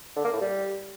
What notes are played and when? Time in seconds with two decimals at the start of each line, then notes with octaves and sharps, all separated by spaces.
0.16 D3
0.25 A#3
0.33 A2
0.41 G3